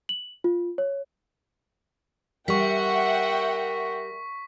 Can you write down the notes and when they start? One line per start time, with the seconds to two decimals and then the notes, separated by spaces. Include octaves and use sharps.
0.09 F#7
0.44 F4
0.78 C#5
2.48 G3 A#4 E5 F#5 G5 C#6 B6